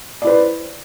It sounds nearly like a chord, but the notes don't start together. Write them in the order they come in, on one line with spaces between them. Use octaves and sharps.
D5 E4 B4 C5